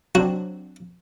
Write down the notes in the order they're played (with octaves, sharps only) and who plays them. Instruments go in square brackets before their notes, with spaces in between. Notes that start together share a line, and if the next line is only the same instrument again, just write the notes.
[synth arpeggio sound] F#3 C4 D4 [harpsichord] F#4